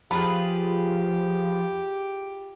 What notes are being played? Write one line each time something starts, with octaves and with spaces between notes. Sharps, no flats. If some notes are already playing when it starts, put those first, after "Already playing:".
F3 F4 G4 G#4 B4 B5